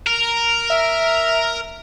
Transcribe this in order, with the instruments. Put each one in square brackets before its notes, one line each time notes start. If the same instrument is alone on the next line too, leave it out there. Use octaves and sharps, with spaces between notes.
[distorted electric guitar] A#4
[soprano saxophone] E5